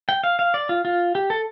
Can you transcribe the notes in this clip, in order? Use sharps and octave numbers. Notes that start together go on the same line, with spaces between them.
G5
F5
F5
D5
F4
F4
G4
A4